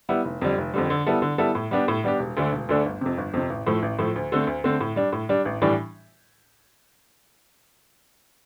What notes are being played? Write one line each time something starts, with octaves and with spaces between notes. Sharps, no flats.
G3 B3 E4
F1
F2 D3 G3
F1
F2 D3 G3
D3
G3 B3 E4 A4
D3
G3 B3 E4 A4
A2
G3 B3 D4 G4
A2
G3 B3 D4 G4
E1
D2 D3 A3 D4
E1
D2 D3 A3 D4
G1
F2 C3
G1
F2 C3
A1
A2 F3 A3
A1
A2 F3 A3
D2
D3 A3 C4
D2
D3 A3 C4
A2
G3 D4
A2
G3 D4
A1
A2 E3 G3 D4